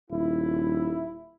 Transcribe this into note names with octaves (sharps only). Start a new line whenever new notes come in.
D#1 E4